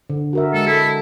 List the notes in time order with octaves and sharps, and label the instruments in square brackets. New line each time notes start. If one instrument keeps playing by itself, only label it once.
[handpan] D3
F#4 A#4 E5
[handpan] G#3 [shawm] A4
[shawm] E4 [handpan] A4